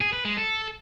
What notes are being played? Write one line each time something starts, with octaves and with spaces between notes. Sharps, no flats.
G#4
B4
G#3
A4